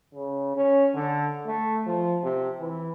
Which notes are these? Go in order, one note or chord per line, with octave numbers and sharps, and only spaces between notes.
C#3
C#4
D3
A3
F3
C3
E3